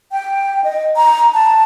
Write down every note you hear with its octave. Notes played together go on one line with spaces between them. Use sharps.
G5
D#5
A#5
A5